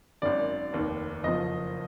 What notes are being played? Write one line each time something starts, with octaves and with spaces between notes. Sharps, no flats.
G#1 F#2 D#3 D5
F1 D#2 D#3
F#1 F2 F3 D#5